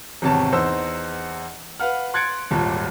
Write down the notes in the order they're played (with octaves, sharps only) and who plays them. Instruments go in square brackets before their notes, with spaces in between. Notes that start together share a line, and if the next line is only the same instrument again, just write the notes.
[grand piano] G#1 E2 C3 C#5 A5
E2 D#4 C5 E6
B4 F5 F#5 F6
C6 F#6 G#6 A6 C#7 D7
D#1 G#1 A#2 A5